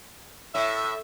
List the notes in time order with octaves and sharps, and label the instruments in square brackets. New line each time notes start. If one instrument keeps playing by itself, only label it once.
[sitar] A2 [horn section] E5